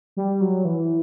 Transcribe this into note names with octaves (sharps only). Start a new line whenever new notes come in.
G3
F#3
E3